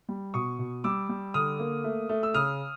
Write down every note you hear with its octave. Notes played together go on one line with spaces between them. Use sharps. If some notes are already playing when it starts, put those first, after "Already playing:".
G3
B2 C#6 D#6
B2
G3 D6 E6
G3
D3 D#6 F6
A#3
A3
A3
E6
C#3 D#6 F6